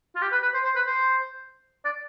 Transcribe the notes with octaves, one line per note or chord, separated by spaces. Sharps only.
F4
G4
B4
B4
C5
C5
B4
C5
D5